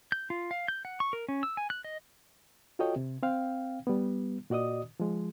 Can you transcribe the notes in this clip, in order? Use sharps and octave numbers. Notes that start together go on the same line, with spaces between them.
G6
F4
F5
G6
F#5
C#6
A#4
C#4
E6
G#5
F#6
D#5
F4 F#4 A4 C#5 D#5 G5
C3
C4 F5 G5
G3 B3
A#2 F#4 D5 D#5 D#6
F3 G#3